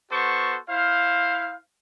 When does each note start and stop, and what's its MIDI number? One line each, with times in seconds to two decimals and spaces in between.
0.11 0.57 59
0.11 0.57 66
0.11 0.57 69
0.11 0.57 72
0.11 0.57 85
0.69 1.58 64
0.69 1.58 72
0.69 1.58 77